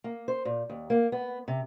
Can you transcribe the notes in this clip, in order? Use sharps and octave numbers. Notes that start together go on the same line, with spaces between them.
A#3
C5
A#2
D#2
A#3
B3
C3